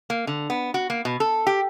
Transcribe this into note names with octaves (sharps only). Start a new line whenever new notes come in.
A#3
D3
B3
F#4
A#3
B2
A4
G4